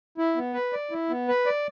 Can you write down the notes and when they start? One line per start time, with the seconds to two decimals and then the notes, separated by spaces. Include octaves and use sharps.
0.18 E4
0.36 B3
0.54 B4
0.73 D5
0.91 E4
1.09 B3
1.28 B4
1.46 D5